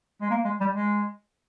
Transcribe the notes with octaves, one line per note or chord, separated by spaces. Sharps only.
G#3
A#3
G#3
G3
G#3